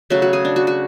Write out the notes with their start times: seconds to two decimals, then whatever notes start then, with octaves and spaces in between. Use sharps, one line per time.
0.10 C#3 F#3 A3 F#4
0.22 F#4
0.33 G#4
0.45 D4
0.56 F#4
0.67 F#4